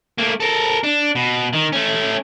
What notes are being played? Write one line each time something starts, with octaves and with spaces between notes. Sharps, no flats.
A3 A#3
A4 A#4
D4
B2
D#3
A3 C#4